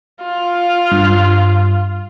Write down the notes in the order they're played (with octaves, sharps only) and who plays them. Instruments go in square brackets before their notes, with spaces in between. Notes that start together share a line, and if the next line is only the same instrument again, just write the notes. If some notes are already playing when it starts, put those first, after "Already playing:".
[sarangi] F4
[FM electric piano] G2